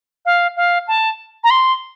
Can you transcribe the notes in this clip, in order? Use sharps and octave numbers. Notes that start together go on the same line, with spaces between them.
F5
F5
A5
A#5
C6